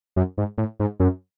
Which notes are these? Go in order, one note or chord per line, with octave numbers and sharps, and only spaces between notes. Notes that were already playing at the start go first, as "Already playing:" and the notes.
F#2
G#2
A2
G#2
F#2